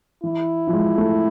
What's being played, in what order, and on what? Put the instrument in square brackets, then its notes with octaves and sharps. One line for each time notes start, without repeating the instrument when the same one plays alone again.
[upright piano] E3 [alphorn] E4
[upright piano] F3
G#3
A3